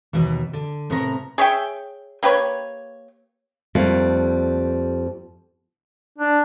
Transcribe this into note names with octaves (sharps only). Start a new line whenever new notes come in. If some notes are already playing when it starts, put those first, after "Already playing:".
D#2 B2 E3
D3
A2 C3 B3 A#4 D5 A#5
G#4 C#5 E5 G5
A#3 G4 B4 C#5
F2 G3 A3 A#3
D4